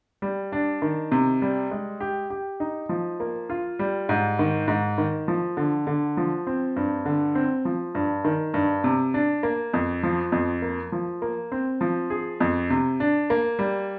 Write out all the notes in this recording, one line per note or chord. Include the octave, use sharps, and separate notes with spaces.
G3
D4
D#3
C3
G3
G#3
G4
G4
D#4
F3
A#3
F4
G3
G#2
D#3
G#2
D#3
F3
D3
D3
F3
C4
G2
D3
C4
F3
G2
D#3
G2
C3
D4
A#3
F2
F3
F2
A#3
F3
A#3
C4
F3
G#4
F2
C3
D4
A#3
G3